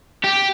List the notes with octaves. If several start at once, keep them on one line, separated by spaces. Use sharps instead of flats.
G4